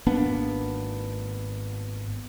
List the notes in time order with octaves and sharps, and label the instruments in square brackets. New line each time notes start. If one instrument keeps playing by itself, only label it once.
[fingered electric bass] G#1 A#3 B3 D4